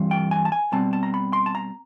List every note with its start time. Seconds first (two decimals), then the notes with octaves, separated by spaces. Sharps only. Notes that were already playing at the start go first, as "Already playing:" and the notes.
Already playing: G2 E3 G3 C4 F4
0.11 G5
0.31 G#5
0.45 A5
0.52 G#5
0.72 B2 G3 C4 A5
0.93 A5
1.03 A#5
1.14 B5
1.33 C6
1.46 A5
1.55 A#5